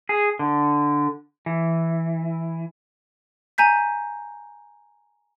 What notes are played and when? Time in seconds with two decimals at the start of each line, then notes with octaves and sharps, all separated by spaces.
0.09 G#4
0.39 D3
1.46 E3
3.58 G#5 A#5 G6 B6